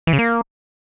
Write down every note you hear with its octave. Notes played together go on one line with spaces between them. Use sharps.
E3
C#3
A#3